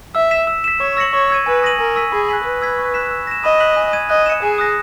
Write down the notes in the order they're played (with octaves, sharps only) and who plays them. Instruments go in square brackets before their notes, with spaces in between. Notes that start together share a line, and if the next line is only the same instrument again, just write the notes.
[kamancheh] E5 [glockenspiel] E6
[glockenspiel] B6 E7
E6
B6 E7
[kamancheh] C#5 [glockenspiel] C#6
[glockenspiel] E6 A#6 C#7 F#7
[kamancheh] C#5 [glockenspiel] C#6
[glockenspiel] E6 G#6 D#7
[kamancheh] B4 [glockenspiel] G#5
[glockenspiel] D#6 A#6 D#7 F#7
[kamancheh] A#4 [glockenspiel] G#5
[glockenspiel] C#6 E6 B6 D#7
[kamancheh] G#4 [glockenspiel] B5
[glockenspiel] F#6 B6 F#7
[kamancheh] B4 [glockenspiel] B5
[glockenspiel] E6 G#6 B6
C#6
F#6 B6 E7
E6
A#6 E7
[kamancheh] D#5 [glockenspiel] B5
[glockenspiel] F#6 B6 F#7
G#5
D#6 G#6 D#7
[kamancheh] D#5 [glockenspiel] F#6
[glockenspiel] C#7 E7
[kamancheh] G#4 [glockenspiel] G#5
[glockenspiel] D#6 F#6 A#6